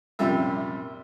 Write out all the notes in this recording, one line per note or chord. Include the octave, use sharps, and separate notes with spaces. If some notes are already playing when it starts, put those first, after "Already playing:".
A#1 F#2 C3 G3 F4 E5